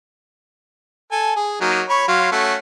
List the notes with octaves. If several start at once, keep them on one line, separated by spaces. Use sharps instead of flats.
A4 G#5
G#4
F#3 A#3 D#4
C#5 B5 C#6
F#3 F5 C6
A3 C#4 F#4